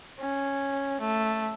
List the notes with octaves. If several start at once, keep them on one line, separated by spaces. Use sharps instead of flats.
C#4
A3